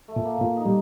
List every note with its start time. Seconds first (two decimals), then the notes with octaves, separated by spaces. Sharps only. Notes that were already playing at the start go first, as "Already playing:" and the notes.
0.08 A3
0.16 A#2
0.25 A#3
0.41 A#2
0.57 D#4
0.66 G3